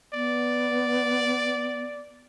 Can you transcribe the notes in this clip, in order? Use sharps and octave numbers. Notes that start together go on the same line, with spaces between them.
B3 D5